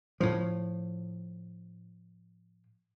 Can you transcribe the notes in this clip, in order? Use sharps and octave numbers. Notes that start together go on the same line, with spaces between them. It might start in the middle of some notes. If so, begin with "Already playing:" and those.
A2 F3